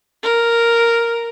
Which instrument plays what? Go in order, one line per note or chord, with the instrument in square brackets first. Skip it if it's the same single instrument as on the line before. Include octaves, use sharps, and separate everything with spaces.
[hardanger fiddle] A#4